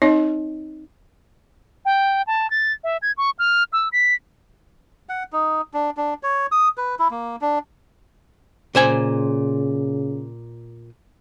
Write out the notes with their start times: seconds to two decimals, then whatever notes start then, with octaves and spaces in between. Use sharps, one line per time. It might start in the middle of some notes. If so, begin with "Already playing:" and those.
0.02 C4 D#4 C#5 D#5
1.85 G5
2.27 A5
2.50 A6
2.84 E5
3.02 G#6
3.18 C#6
3.39 F6
3.73 E6
3.92 B6
5.09 F#5
5.33 D#4
5.74 D4
5.97 D4
6.23 C#5
6.52 D#6
6.77 B4
6.99 E4
7.11 A#3
7.41 D4
8.75 A#2 C#3 C5 G#5